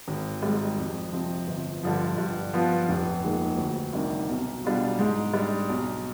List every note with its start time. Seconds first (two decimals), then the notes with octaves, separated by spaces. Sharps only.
0.08 G#1
0.43 G#2 G3
0.78 F2
1.13 C3 F3 C4
1.47 G1
1.83 G2 D3 F3
2.18 G2
2.53 F3 B3 F4
2.89 F1
3.23 D#2 D#3 G#3
3.58 D2
3.93 C3 D#3 G3 D4
4.29 B1
4.64 B2 G3 D4 F4
4.99 G#2
5.34 G3 D4
5.69 B1